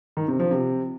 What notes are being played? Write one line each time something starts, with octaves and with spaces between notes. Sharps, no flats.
D#3
C3
F3
C3